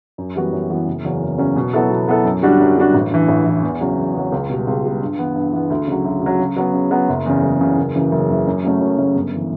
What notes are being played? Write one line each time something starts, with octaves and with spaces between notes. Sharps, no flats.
F#2
E3 G3 B3 F#4
F#2
E3 G3 B3 F#4
F#1
E2 C#3 F#3 C#4
F#1
E2 C#3 F#3 C#4
B2
F#3 B3 E4 A4
B2
F#3 B3 E4 A4
F#2
D3 G3 D4 F#4
F#2
D3 G3 D4 F#4
A1
G2 E3
A1
G2 E3
E2
C#3 F#3
E2
C#3 F#3
C#2
B2 G3
C#2
B2 G3
G2
E3 B3
G2
E3 B3
D2
C#3 F#3
D2
C#3 F#3
C#3
F#3 B3
C#3
F#3 B3
F#1
E2 C#3
F#1
E2 C#3
F#1
F#2 C#3 E3
F#1
F#2 C#3 E3
F#2
C#3 F#3 A3 C#4
F#2
C#3 F#3 A3 C#4
G1
E3